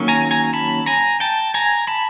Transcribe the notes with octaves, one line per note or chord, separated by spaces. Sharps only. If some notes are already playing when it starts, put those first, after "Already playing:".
Already playing: D#3 F#3 A#3 C#4
G#5 A#5
G#5 A#5
A5 B5
G#5 A#5
G5 A5
G#5 A#5
A5 B5